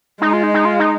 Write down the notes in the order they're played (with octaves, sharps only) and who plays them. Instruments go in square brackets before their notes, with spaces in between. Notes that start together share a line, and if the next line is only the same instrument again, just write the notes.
[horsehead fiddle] G#3 [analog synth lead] D#4
[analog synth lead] F4
D#4
D#4
F4
D#4